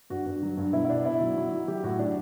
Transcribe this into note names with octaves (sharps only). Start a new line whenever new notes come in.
G2 F#4
G2
F#3
G2
B2 E4
E4
B2 D4
B2 E4
F#3
F#3
F#3
F#3 G4
A2 F#4
F#3 D4